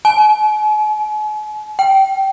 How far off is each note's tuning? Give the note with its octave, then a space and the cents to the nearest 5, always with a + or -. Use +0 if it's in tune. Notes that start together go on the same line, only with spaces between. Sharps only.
G#5 +45
G5 -20